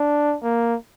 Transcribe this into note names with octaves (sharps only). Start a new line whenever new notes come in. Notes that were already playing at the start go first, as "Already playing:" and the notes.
Already playing: D4
A#3